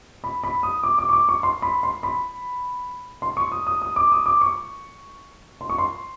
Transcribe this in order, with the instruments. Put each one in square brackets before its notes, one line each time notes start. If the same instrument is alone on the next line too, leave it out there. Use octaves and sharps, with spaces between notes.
[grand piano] B5
B5
D#6
D6
D6
C#6
D6
C#6
C6
B5
C6
B5
C6
C#6
D#6
D#6
D#6
D6
D#6
D6
C#6
C6
C#6
C6